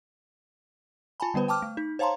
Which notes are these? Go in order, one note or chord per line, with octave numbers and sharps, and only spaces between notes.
F4 G#5 A5 B5
D3 G3 B3 B4 C5
G5 A5 D6 F6
A3
D#4
C5 C#5 F5 A5 A#5 C6